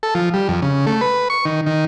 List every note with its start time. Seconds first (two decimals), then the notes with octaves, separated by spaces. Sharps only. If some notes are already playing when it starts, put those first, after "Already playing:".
0.03 A4
0.15 F3
0.34 G3
0.49 F2
0.62 C#3
0.86 A3
1.01 B4
1.30 C#6
1.45 D#3
1.66 D#3